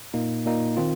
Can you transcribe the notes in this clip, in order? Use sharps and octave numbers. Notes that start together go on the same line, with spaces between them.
A#2 A#3 D#4
A#2 A#3 D#4
D#3 C4 F4